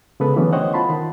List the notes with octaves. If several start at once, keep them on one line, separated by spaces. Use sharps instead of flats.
C#3 G#3 B3 A4 B4
D3 E3 F#3 A3 B3 C#4
C5 C#5 D#5 F#5 G5
F4 A5 B5 C6
D#3